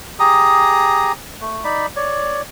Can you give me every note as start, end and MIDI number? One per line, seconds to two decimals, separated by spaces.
0.20 1.12 67
0.20 1.12 68
0.20 1.12 82
0.20 1.12 87
1.41 1.64 57
1.64 1.86 63
1.64 1.86 74
1.64 1.86 83
1.96 2.42 73
1.96 2.42 74